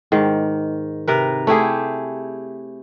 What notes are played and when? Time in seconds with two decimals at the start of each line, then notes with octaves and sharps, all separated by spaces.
0.12 G#2 D#3
1.08 C3 A#4 B4
1.47 A3 E4 G4 G#4